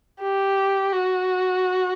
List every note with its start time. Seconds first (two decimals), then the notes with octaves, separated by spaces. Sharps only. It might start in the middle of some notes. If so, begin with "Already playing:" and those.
0.21 G4
0.93 F#4